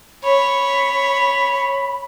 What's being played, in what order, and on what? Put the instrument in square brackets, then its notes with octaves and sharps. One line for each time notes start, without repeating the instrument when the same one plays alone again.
[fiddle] C#5 [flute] B5